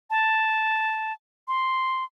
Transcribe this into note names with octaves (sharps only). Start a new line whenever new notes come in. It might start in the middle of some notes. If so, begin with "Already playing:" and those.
A5
C6